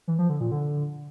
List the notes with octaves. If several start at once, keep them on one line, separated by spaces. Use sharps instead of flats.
E3
F3
D3
A#2
D3